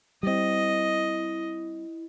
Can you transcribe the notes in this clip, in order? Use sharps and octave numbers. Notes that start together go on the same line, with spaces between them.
G3 C4 E4 D#5